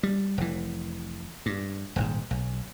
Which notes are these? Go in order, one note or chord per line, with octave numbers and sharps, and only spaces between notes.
G3
F1 E3
G2
D#1 G#1 G#2
B1